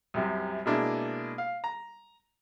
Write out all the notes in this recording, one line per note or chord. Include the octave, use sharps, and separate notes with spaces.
C2 F#2 C3
B2 G#3 A#3 D4 E4
F5
A#5